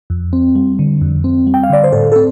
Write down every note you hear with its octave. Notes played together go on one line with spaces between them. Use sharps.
F2
C4
G3
D3
F2
C4
G3
G5
F5
D3 D5
C5
A2 A4
C4 A4